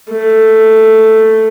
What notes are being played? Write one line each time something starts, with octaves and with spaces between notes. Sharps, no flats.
A3